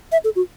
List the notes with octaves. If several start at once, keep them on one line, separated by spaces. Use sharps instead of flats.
E5
A4
F#4